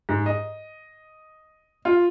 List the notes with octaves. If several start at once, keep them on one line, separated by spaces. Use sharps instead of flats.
G#2
D#5
F4